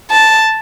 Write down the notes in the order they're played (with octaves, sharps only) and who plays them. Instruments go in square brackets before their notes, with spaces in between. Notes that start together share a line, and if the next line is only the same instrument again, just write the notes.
[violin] A5